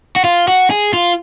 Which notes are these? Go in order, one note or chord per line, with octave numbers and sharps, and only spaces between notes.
F#4
F4
F#4
G#4
F4